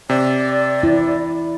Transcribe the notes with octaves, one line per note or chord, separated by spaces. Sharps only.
C3 D5
E4